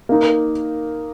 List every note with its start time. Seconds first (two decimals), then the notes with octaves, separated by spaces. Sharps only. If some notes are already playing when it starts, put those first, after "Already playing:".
0.09 A#3 D#4 A#4